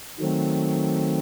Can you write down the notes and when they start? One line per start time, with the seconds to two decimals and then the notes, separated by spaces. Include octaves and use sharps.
0.19 D#3 F#3 A3 C4